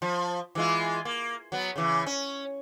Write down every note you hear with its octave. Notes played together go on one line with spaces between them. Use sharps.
F3
E3 G#3 F4
A#3
F#3 B3
C#3 E3
C#4